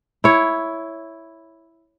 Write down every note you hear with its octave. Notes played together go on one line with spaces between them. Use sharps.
E4 C#5